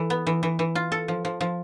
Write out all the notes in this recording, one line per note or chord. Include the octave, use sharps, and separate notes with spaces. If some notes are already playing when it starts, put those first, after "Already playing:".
Already playing: E3 A4
B3
E3
E3
E3
F4
A4
F3
F3
F3